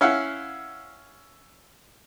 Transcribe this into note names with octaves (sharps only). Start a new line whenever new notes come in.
C#4 E4 F5 F#5